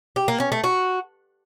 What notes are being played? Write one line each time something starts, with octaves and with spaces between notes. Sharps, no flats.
G4
A#3
C#4
A3
F#4